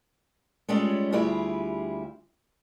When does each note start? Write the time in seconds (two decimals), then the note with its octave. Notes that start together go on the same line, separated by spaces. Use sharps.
0.69 G3 G#3 C#4 F4 A4
1.12 D2 G3 E4 F4 G4 G#4